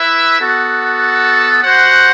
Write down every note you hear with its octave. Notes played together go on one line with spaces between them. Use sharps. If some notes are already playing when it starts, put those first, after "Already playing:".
Already playing: E4 B4 E5
B3 F#4 A4
F#4 C5 F#5